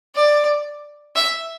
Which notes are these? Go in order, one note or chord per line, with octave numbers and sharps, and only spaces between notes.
D5
E5